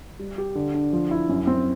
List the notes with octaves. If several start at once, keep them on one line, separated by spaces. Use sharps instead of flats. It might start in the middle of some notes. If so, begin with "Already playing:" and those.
G3
G4
D3
D4
F3
E4
F#2
C4